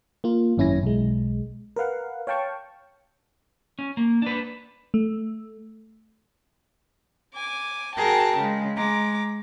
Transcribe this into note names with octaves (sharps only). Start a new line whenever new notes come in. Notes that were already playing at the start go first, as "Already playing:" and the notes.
A#3 F4
G#1 F#2 C#4 E4 G#5 A#6
B1 G#3
A#4 B4 F5 F#5
C#5 F5 G5 A5 C#6
C#4
A#3
D4 B4
A3
G#5 D6
F#4 G#4 A#4 G5 A5
C#3 G#3
G#3 A#5 D6